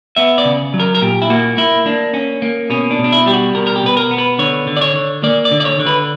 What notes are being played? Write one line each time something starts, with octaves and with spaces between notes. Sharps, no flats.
B3 E5
D5
C#3
F#3
A#4
A#4
A#2 G4
E4
A#3 F#4
A#3 E4
A#3 D4
C#4
A#3
B2 C#4
D4
B2
D4
E4
G3 G4
F#4
B2 A#4
A#4
G4
B2 B4
A#4
B3
B4
D3 C#5
D3
D5
C#5
D3
A#3 D5
D5
D3
D5
C#5
D3
B4